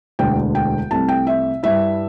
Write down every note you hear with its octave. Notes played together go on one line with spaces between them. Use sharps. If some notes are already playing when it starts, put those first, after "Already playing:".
E1 D2 D3 G5
G5
C2 C3 A3 A5
G5
E5
G2 G3 E4 E5